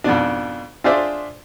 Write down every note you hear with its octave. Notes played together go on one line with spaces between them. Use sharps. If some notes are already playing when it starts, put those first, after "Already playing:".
F2 G#2 B2 D4
D4 F4 G#4 C5 D5 E5